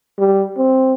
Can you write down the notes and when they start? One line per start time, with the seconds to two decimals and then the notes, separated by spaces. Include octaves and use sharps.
0.19 G3
0.57 C4